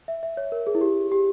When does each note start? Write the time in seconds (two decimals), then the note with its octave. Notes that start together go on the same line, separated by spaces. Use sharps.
0.08 E5
0.23 E5
0.37 C#5
0.52 A#4
0.67 G#4
0.75 E4
0.81 G4
1.12 G4